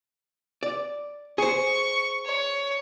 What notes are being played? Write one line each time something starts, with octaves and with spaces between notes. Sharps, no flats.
D5
G#4 C5 C#6
C#5